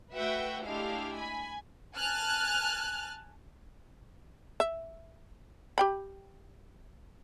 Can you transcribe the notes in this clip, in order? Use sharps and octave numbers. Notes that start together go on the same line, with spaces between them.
A3 F#4 B4 E5 F#5 G5
G#3 A3 D4 E4 G4 F5
G#5 B5
G#5 A5 F6 F#6
E5
G4 G5 B5